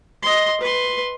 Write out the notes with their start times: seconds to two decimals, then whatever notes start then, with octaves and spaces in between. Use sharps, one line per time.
0.23 D#5 C6
0.61 B4 C6